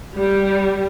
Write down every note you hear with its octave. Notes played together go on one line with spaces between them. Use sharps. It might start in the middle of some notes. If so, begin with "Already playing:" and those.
G3